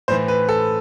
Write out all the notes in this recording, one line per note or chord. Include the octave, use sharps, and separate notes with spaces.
A2 E3 C5
B4
A4